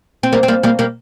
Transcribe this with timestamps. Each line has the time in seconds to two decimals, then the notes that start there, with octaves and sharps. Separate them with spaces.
0.23 C4
0.33 G3 A#3
0.43 C4
0.48 G3 A#3
0.63 G3 A#3
0.79 G3 A#3